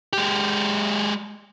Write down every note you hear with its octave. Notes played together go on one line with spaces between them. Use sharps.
G#3 G4